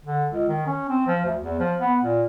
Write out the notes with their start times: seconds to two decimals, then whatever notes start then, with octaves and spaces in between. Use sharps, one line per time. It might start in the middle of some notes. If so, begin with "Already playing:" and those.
0.05 D3
0.31 C#2
0.49 D#3
0.67 C#4
0.89 C4
1.07 F3
1.25 D2
1.42 E2
1.59 F3
1.79 B3
2.04 A#2